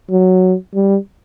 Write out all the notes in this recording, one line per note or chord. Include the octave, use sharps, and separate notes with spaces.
F#3
G3